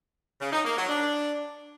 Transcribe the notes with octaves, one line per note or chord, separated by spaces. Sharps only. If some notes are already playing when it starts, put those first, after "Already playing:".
C#3
D#4
A#3
F#3
D4